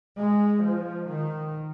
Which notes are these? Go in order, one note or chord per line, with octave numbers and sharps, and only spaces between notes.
G#3
F3
D#3